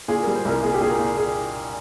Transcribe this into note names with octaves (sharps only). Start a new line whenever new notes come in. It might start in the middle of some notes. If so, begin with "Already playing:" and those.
A#2 G#4
G3 A#4
C5
C2 A#4
A#2 G#4
G4
A#2 G#4
A#4
A#2
G#4